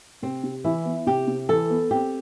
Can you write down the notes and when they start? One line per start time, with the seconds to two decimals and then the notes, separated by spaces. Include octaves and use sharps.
0.22 C3 C4
0.43 C3
0.64 E3 E4
0.85 B3
1.06 C3 G4
1.28 C3
1.49 E3 A4
1.70 B3
1.91 C4 G4